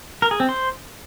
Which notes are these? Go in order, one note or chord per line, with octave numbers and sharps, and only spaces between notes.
A#4
G#4
C4
C5